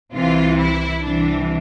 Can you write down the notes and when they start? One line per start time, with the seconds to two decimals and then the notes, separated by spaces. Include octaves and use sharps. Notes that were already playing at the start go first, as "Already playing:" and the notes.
0.13 C2 C3 E3 F4
0.59 E4
1.03 C2 C3 E3 D4